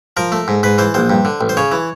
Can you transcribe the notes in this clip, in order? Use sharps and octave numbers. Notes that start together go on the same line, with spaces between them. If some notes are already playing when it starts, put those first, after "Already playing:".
F3 A#4
A3
G#2
G#2 B4
E3 C5
A#1 C5
G2
D3
A1
C5
C#3 C#5
E3